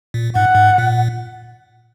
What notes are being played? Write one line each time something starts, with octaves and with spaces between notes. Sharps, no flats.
A#2
G#2 F#5
G#2
A#2